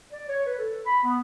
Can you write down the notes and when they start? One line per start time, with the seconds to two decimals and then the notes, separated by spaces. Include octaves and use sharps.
0.12 D5
0.29 C#5
0.46 B4
0.58 A4
0.86 B5
1.04 B3